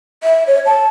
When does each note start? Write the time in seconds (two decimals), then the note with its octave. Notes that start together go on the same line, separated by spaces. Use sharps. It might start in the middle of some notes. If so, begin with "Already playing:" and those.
0.23 E5
0.47 C#5
0.66 A5